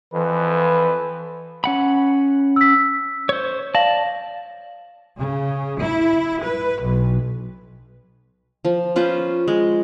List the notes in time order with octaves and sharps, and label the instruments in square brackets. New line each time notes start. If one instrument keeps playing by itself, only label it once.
[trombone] F2 [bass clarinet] E3 [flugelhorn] B4
[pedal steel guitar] C#4 F#5 B5
[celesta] E6 B6
[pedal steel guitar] C5 C#5
[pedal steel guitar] D5 A5 [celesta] F5 A#6 F#7
[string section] C#3
E4
B4
B1
[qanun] F3
C#4 F4 B4 C5
G#3